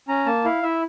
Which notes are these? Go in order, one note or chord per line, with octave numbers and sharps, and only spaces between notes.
C#4 A#5
A#3 A5
E4 F5
E4 E5